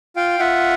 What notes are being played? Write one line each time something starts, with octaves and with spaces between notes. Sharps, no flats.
F4 F5 G5
F4 E5 F#5